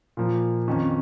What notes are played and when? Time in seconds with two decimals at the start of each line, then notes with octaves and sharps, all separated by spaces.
0.17 A#2 F3 A#3
0.68 F2 D#3 C#4